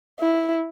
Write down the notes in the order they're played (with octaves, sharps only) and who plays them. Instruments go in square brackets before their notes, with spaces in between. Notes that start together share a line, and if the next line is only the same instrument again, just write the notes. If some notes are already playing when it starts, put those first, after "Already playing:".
[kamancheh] E4